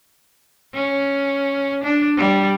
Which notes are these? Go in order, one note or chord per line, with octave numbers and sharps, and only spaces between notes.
C#4
D4
G3